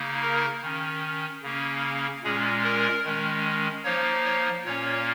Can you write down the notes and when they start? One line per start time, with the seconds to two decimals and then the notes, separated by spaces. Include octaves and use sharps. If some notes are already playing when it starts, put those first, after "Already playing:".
Already playing: C#3 A#3 D#4
0.22 A#4
0.62 D#3 C#4
1.43 C#3 A#3 C#4
2.24 A#2 G#3 C#4 G#4
2.63 A#4
3.04 D#3 G#3 C#4
3.84 F3 A#3 D#4 C#5
4.24 C#5
4.65 A#2 A#3 C#4 C#5